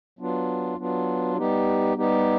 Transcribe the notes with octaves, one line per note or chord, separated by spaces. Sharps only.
F#3 B3 D4 F4
F#3 B3 D4 F4
G3 B3 D#4 G4
G3 B3 D#4 G4